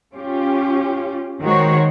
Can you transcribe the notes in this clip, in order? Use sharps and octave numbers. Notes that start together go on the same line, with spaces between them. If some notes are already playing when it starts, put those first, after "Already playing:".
C#4 F4 G4
D#3 G#3 F#4 C5 C#5